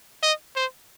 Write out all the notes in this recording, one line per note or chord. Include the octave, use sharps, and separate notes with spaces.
D#5
C5